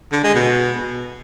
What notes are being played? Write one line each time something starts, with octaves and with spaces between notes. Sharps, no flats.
D3
G#3
B2